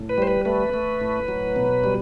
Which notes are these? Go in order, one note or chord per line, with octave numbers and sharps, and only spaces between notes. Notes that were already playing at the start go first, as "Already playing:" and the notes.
Already playing: A2
B4
G3 C5
B4
A3 B4
A3
A2
F#3
B2
G3